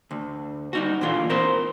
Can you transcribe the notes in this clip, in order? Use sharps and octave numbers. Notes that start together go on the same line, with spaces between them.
D2
G3 D#4 F#4
A#2 D3 E3 F4
C4 A#4 C5